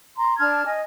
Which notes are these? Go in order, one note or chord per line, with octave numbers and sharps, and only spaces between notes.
A#5 C6
D4 A5 F6 G#6
D#5 G#5